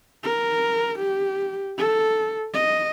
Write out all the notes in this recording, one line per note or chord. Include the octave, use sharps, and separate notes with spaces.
A#4
G4
A4
D#5